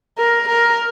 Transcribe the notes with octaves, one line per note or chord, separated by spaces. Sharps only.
A#4
A#4